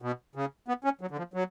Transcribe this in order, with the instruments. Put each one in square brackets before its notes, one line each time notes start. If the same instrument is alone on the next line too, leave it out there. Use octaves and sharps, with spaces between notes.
[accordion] B2
C#3
B3
C#4
F#3
D3
F3
F#3